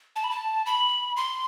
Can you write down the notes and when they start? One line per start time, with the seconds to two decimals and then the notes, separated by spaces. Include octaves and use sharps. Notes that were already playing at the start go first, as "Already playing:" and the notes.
0.16 A5
0.24 B5
0.31 A5
0.66 B5
1.17 C6